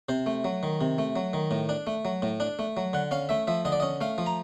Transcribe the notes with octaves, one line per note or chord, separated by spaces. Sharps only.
C3 C5
A3
F#3
D#3
C3
A3
F#3
D#3
A2
D4
A3
F#3
A2
D4
A3
F#3
D3 F#5
C#4 F5
A3 E5
F3 E5
D3 D#5
D5
C#4 D#5
A3 F5
F3
A#5